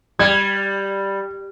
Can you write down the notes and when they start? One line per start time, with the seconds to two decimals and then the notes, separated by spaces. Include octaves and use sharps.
0.19 G3 G#6